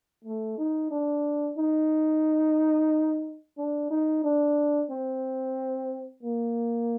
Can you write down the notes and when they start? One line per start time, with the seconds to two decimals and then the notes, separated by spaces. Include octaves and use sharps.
0.25 A3
0.58 D#4
0.91 D4
1.58 D#4
3.58 D4
3.91 D#4
4.24 D4
4.90 C4
6.23 A#3